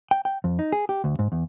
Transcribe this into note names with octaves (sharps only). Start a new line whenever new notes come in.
G5
G5
F2
D#4
G#4
G4
D2
G#2
E2